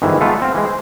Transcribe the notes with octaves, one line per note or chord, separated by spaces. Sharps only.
G1 G#2 D#3 E3
G#3 A3 B3 F4 A4
C4 F5
E3 G#3
C5